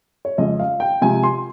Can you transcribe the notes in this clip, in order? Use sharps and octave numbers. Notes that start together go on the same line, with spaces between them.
C#5
F2 C#3 G#3 D#5
F5
G5
C3 F3 G#3 G#5
C6